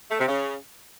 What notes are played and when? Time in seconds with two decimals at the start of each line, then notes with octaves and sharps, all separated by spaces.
0.11 A3
0.19 C3
0.28 C#3